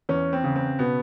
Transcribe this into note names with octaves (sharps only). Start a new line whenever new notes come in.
E2 C#4
C4
C#3
C4
B2 B3